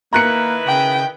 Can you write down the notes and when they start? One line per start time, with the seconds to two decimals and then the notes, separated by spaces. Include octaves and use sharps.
0.13 D#3 A#3 E4 B4 A#5 F#6 C#7
0.67 C#3 G5